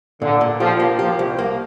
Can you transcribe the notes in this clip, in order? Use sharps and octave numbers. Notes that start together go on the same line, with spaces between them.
A#2 D3
A#2
F3 G4
A#3
F3 G4
C2
A#3